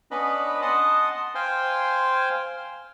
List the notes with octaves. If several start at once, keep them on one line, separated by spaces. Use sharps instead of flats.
B3 C#4 D4 B4 D#5 B5
D#5 F#5 A5 C6 D#6
C5 F5 G5 G#5 C6